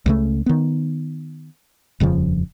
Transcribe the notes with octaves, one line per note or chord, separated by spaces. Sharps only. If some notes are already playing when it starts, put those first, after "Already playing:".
C#2 C#3 A3
D#3 B3
D#1 F2 C#3 F3